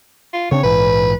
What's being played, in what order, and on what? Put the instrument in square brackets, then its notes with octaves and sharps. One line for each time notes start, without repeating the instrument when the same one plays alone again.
[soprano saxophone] F4
[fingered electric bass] C#3 C4 D4 [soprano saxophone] C#5
[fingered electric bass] A#1 G#2 E3 [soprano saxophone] B4